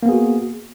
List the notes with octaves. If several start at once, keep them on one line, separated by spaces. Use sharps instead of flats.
A#3 B3 F#4 G#4